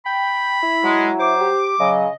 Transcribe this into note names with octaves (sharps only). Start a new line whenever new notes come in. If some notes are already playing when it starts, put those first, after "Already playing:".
G5 B5
E4
F#3 G#3
C5 D6
G4
C#3 F#3 D#5